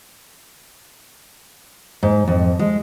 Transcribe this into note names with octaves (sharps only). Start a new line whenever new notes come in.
G#2
F2
G#3